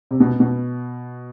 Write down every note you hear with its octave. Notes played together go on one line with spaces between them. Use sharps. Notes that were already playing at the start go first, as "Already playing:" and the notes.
C3
B2
B2